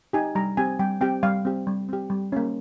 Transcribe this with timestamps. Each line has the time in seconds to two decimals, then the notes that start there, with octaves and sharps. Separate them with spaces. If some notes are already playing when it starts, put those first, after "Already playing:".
0.13 D#4 G4 G#5
0.35 G3 A#5
0.57 C4 G4 G#5
0.79 G3 G5
1.01 C4 G4 G5
1.23 G3 F5
1.45 C4 G4
1.67 G3
1.89 C4 G4
2.10 G3
2.32 A#3 C#4